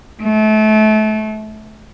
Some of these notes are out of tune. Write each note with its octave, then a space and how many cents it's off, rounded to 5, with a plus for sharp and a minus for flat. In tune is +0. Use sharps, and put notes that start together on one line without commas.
A3 -30